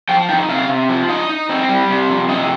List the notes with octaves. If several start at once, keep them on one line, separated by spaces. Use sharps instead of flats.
F3 G5
D#4 G5
C3 F5
C3
F3
D#4 D#5
D#4
C4
G3
C3
F2
C3 D#5